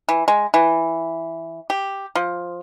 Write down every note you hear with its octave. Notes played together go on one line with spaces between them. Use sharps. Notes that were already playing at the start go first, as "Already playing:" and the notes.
E3
G#3
E3
G4
F3